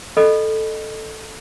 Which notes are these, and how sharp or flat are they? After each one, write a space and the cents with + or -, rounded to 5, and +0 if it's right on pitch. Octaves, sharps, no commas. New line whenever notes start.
A4 +0 D#5 -25 B5 +0